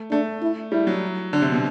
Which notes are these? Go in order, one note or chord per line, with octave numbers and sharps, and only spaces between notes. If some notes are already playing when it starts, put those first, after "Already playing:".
Already playing: A3
A3 D4
E4
G3 E4
F#3
D3 D4
C3
B2